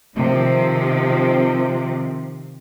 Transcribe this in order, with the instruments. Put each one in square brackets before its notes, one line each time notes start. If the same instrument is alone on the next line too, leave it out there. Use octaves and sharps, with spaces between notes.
[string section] C3 D#3 F3